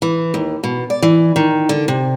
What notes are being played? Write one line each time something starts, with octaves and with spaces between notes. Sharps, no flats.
E3
D#2
B2
D5
E3
D#3
D3
C3